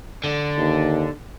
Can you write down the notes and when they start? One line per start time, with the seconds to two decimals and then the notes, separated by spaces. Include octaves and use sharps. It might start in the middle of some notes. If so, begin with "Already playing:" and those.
0.24 D3
0.57 D#2